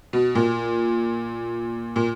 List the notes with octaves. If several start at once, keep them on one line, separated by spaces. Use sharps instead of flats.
B2
A#2
A#2